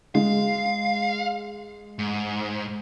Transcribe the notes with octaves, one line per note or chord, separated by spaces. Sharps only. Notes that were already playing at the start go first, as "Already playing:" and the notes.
G#3 F5
G#2